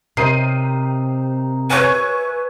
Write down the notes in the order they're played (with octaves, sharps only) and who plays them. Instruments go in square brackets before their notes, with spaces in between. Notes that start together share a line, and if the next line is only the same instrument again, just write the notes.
[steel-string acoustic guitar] C3 [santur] D#4 A#4 C5 [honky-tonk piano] C7 D#7
[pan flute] B4 [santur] C#5 E5 [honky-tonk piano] G#5 C#6 G#6